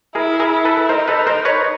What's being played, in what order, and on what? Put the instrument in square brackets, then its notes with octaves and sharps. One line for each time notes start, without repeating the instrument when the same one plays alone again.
[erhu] E4 [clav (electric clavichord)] G#4 A#4
[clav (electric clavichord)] G#4 A#4
[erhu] E4
[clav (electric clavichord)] A4 B4
[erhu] D#4 [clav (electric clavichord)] A#4 C5
[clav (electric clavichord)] A4 B4
A#4 C5
B4 C#5